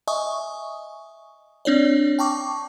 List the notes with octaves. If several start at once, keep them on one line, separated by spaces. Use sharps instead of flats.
D#5 E5 G#5 C#6 D#6
C4 D4 C#5 D5
G5 A5 C#6 D6